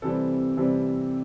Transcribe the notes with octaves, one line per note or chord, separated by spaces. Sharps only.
C3 E3 G3 C4 A4
C3 E3 G3 C4